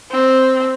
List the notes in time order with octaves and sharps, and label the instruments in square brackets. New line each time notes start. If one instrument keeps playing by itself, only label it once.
[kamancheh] C4